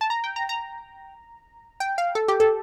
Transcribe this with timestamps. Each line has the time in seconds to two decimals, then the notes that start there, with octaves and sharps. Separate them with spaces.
0.01 A5
0.10 A#5
0.24 G5
0.36 A#5
0.49 A#5
1.80 G5
1.98 F5
2.15 A4
2.28 G4
2.40 A4